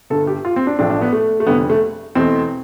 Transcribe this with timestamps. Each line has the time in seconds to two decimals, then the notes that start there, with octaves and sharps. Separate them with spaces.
0.10 G1 G2 D3 A4
0.27 G4
0.45 F4
0.56 C4
0.67 D4
0.79 A1 A2 F3 A3 D4
0.90 D4
1.01 B3
1.13 A3
1.40 A3
1.47 F1 F2 D3 G3 B3
1.70 A3
2.15 E2 B2 A3 C4